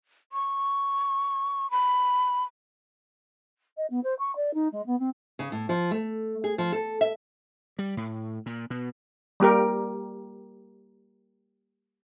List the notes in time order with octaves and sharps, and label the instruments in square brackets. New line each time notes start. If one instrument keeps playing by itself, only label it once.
[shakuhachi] C#6
B5
[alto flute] D#5
B3
C5
C#6
D5
D#4
G#3
B3
C4
[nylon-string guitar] C#3
A2
F3
A3
G#4
F3
A4
E5
[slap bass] G3
A2
A#2
B2
[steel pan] G3 A#3 G4 A#4